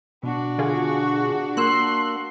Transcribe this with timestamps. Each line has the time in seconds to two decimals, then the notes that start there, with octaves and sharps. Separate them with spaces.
0.23 B2 D4 F#4
0.58 D3 F4 G#4
1.57 A#3 C6 E6 F#6